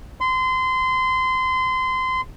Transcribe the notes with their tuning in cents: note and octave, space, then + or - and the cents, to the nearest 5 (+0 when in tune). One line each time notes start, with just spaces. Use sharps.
C6 -25